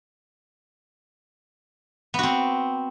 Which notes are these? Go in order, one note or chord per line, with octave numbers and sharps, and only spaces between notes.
B3 C4 F#4